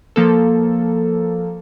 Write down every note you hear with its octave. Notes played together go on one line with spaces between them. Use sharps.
F3 A#3 A4